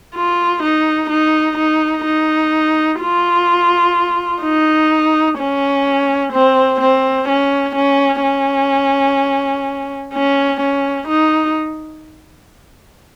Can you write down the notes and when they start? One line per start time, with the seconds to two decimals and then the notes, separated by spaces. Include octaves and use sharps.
0.15 F4
0.63 D#4
1.10 D#4
1.58 D#4
2.05 D#4
3.01 F4
4.43 D#4
5.39 C#4
6.33 C4
6.81 C4
7.29 C#4
7.75 C#4
8.23 C#4
10.14 C#4
10.60 C#4
11.08 D#4